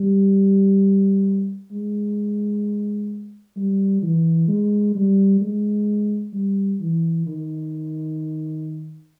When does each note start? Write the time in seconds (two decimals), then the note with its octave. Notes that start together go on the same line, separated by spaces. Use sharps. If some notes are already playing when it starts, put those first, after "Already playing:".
Already playing: G3
1.72 G#3
3.57 G3
4.02 E3
4.48 G#3
4.95 G3
5.41 G#3
6.33 G3
6.81 E3
7.27 D#3